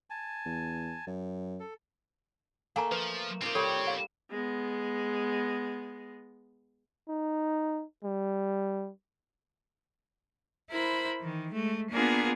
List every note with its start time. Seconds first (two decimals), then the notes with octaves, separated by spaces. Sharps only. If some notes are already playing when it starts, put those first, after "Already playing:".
0.10 G#5 A5
0.45 E2
1.07 F#2
1.60 A4
2.76 A3 A#3 A4 F5 G#5 A#5
2.92 F3 B4
3.42 A#3 C4 D#4 F4 G4
3.55 G3 A4 C#5
3.87 F5
4.30 G#3 B3
7.09 D#4
8.04 G3
10.69 E4 A#4 C5 B5
11.19 D#3 E3
11.51 G#3 A3
11.90 A#3 B3 D4 F4 G#4 A#4